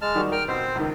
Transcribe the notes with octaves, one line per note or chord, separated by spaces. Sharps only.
G#3 A5 F6
D#3 G3 F#4
A#4 G5 F6
B2 C4 C5
C#2 D#3